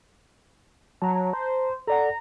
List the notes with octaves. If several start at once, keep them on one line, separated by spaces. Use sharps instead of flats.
F#3 A5 A#5
C5
A4 D5 F#5 A#5